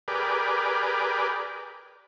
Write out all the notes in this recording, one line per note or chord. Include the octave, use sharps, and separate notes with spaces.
G4 G#4 A#4 B4 D5